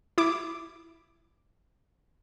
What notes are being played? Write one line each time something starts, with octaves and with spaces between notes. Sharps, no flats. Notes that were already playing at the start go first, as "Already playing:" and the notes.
E4 D6